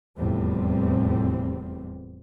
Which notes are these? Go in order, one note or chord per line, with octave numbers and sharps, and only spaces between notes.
F1 E2 A2 G3 C4